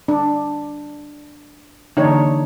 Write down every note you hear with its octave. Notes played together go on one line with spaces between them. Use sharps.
D4
D3 E3 A#3 D4 D#4 C#5